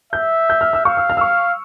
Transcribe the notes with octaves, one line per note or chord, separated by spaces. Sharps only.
E5 G6
G6
F6
E6
F5 C#6
E6
F6
E6
C#6